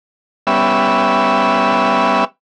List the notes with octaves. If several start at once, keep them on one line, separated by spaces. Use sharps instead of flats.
G3 B3 C#4 E5